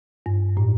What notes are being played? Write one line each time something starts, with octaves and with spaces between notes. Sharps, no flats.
G2
A2